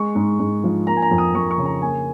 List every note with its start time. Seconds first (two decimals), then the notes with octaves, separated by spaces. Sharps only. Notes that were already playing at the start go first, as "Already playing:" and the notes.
Already playing: G#3 C#6
0.15 G#2
0.39 G#2
0.64 F3
0.87 A#3 A#5
0.96 G#5
1.02 A#5
1.11 F2
1.18 D#6
1.35 F2 C#6
1.51 C#6
1.58 C#3
1.65 A#5
1.82 A#3 G#5